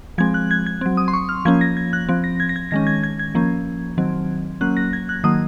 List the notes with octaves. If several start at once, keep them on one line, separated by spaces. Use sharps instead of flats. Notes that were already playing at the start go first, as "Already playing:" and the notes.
F3 G#3 C4 G#6
F#6
G#6
G#6
F#3 C4
D#6
C6
C#6
F6
F3 A#3 C#4 G#6
A#6
G#6
F#6
F3 C4
A#6
G#6
A#6
G#6
D#3 G#3 C#4 A#6
G#6
G#6
G#6
F3 A#3 C#4
D#3 F#3 C4
F#3 A#3 C#4 F#6
A#6
G#6
F#6
D#3 F#3 A#3 D#6